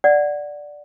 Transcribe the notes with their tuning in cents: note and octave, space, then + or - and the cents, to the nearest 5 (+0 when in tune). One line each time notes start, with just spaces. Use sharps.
D5 +0 F#5 +0